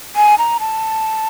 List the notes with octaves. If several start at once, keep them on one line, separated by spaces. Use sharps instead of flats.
G#5
A#5
A5